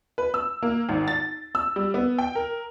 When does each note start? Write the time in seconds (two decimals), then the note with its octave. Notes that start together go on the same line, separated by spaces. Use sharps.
0.18 B4
0.34 E6
0.62 A#3
0.89 G#1
1.08 A6
1.55 E6
1.76 G3
1.94 B3
2.19 G5
2.35 A#4